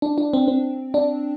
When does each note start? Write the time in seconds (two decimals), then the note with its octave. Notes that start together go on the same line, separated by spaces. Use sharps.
0.02 D4
0.18 D4
0.33 C4
0.48 C4
0.94 D4